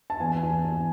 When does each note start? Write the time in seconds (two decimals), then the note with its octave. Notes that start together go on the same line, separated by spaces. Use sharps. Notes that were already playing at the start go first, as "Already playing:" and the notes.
0.10 A5
0.20 E2 G#5
0.43 E2
0.64 E2